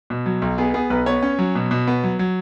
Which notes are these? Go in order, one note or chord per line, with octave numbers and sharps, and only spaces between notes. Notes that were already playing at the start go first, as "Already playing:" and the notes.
B2
F#3
B1
B3 G#4
B3 G#4
B1 B4
B3 C#5
C#4
F#3
B2
B2
B3
F#3
F#3